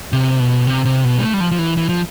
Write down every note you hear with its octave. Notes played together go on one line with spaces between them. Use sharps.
C3
B2
C3
C3
B2
G3
A3
G3
F3
F3
E3
E3
F3